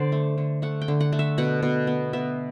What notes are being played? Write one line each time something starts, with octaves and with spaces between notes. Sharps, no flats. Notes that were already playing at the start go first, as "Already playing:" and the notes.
Already playing: D3 C5 D5
A3
D3
A3 F#5
G5
D3
F#5
A3
E5
B2 F#5
B2
B3
B3 E5